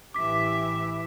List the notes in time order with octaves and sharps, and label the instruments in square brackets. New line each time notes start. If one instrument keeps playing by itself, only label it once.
[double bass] A1 E3 [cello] G4 E5 [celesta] D6 B6